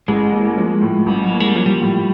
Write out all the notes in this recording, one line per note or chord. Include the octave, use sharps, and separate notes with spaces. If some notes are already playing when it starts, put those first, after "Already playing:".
A1 G#3
A#3
F3
A2
A1 G3
F#3
A#3
G#3
G3
F3 F#3
G3
A2